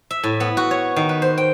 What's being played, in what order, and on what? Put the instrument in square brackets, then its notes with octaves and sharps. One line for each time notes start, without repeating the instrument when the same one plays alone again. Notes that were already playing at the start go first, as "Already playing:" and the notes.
[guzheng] E5
A2
B3
F#4
C#5
D#3
B4
C5
G5